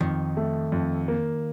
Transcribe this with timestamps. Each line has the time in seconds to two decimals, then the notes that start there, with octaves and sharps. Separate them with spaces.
0.01 F2 D#3
0.37 A3
0.72 F2
1.08 A#3